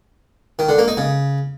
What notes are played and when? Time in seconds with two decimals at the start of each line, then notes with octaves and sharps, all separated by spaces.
0.59 D#3
0.69 D3
0.78 A#3
0.88 D#4
0.97 C#3